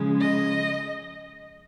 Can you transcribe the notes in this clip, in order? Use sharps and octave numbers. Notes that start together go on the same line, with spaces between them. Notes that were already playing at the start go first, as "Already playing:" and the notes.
Already playing: C#3 F3 G#3
D#5